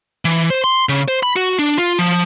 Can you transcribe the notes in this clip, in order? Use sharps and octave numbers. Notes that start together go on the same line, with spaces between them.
E3
C5
C6
C#3
C5
B5
F#4
D4
F4
F3